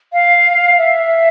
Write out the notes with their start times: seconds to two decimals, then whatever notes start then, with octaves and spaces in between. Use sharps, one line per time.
0.13 F5
0.78 E5